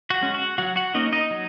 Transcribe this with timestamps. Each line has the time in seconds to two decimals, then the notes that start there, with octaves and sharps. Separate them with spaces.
0.10 F#4 F#5
0.21 G#3 C#4
0.34 F#4 F#5
0.58 F#3 F#4 F#5
0.76 F#4 F#5
0.94 A#3 C#4 D#4 D#5
1.12 D#4 D#5
1.31 F#3